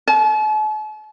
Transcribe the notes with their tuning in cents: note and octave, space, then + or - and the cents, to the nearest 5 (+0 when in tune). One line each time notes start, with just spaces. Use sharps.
A5 -45